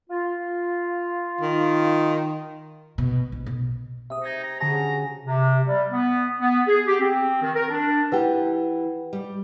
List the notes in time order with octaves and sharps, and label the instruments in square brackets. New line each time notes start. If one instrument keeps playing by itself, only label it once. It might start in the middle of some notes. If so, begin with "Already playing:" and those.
[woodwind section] F4
[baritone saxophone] D#3
[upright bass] B2
A#1
B2
[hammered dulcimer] C3 [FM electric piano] E5 D#6
[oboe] D#4 [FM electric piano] G#6 A#6
[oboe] A#5
[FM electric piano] D3 A5 [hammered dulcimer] F#4 G#4 C#6 [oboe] A#5
[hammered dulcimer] C#3
[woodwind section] C3
G3
B3
B3
G#4
G4
C4
D#3
A#4
D4
[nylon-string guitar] E3 G4 [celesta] B4 F#5 G5
[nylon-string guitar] G3